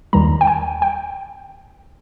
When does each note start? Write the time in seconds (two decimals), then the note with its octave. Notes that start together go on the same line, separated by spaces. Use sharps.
0.13 D#2 D#3 G3 A#5
0.41 G5
0.47 G#5
0.82 G5